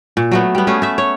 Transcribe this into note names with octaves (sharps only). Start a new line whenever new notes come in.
A#2
F#3 A3 B3
G3 B3
A3 C#4 G#4
A3 E5
C#5